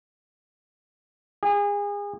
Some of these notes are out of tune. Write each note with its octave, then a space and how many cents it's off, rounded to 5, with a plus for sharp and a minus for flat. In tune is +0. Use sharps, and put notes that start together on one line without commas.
G#4 -30